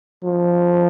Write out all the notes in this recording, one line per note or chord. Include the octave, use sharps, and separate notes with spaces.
F3